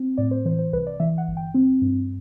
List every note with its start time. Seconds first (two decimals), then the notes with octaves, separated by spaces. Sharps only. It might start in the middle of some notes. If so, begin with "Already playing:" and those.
Already playing: C4
0.18 A2 D5
0.31 C5
0.45 E3 C5
0.59 C5
0.73 C2 B4
0.87 D5
1.00 E3 E5
1.18 F#5
1.28 G1
1.37 G5
1.54 C4
1.82 G2